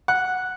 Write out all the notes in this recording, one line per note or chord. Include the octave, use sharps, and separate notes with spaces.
F#5